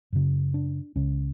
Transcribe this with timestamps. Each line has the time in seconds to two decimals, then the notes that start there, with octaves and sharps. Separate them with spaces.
0.12 F#2 C#3
0.54 D4
0.96 C#2 C#3 C#4